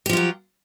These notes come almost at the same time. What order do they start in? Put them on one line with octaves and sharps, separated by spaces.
G4 F3 F4 F#3